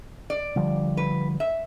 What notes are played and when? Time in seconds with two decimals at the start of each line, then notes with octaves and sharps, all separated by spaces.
0.30 D5
0.56 D3 F3 G3
0.97 B4
1.40 E5